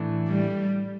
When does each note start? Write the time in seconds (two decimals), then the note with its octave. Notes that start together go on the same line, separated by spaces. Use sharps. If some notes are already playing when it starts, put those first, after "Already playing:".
Already playing: A2 E3 A3 D4
0.29 G3